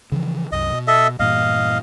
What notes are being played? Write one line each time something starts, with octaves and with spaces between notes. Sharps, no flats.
C#3 E3 F3
C2 F#2 D#5
B2
A4 D#5 E5
G2 A#2 E3 D#5 F5